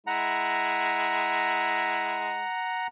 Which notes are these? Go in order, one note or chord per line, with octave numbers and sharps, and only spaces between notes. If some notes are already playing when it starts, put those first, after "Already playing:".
G#3 E4 F#5 A#5